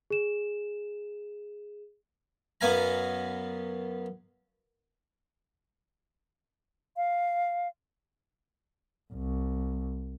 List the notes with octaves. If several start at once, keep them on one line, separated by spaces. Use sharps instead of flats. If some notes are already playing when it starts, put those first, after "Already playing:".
G#4 E7
F#2 B3 F5 G#5 A#5
F5
C2